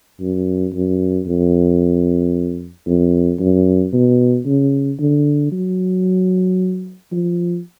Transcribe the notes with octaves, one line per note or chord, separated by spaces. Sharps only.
F#2
F#2
F2
F2
F#2
B2
C#3
D3
F#3
F3